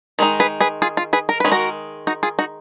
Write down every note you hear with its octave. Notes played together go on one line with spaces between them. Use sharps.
D#3 G#3 D#4
G#4 B4
G#4 B4
F4 G#4
F4
G#4 B4
A#4
D#3 G#3 C#4 B4
F#4 A#4
D#4 F#4
F4 G#4
D#4 F#4